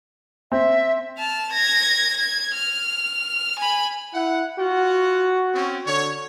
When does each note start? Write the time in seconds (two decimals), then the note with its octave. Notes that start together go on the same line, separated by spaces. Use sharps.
0.52 C4 E5
1.19 A5 F6
1.52 G#6 A#6
2.18 G#6
2.55 F6
3.60 G#5 B5
4.14 E4 F#5
4.59 F4 F#4 F#5
5.53 C4 C#4
5.87 D3 C#5